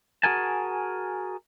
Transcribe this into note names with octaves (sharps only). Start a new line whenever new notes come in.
F#4 G#4 A#4 G#5 A5